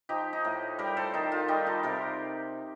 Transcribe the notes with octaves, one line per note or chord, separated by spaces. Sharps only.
F3 D#4 G4
D#4
A2
G3 G4 A#4
A4 C5
D#3 D#4
F4
G3 D#4 G4
F4 A4
C3 G4 A#4